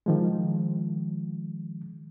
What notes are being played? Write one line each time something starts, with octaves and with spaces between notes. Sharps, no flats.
D#3 F3 G#3